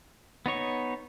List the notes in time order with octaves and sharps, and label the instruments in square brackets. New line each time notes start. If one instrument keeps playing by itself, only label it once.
[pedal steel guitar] B3 D#4 C#5 C#6